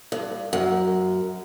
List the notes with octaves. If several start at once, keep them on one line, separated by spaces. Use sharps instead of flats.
G2
F#2